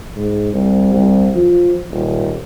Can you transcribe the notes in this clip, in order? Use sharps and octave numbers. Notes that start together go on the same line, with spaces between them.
G#2
C2
C2
F3
D#1